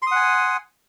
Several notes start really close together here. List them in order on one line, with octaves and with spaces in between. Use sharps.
C6 D#6 F#5 G#5